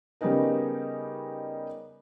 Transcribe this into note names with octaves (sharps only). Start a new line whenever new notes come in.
C#3 G3 B3 C#4 D#4 A#4